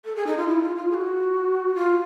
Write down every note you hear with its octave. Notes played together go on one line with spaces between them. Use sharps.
A4
G#4
D#4
F4
E4
F4
F4
G#4
F#4
F4